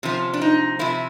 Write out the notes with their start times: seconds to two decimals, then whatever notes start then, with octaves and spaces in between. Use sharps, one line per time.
0.03 C3 F3 C#4
0.34 D4
0.41 D#4
0.79 C3 F3 E4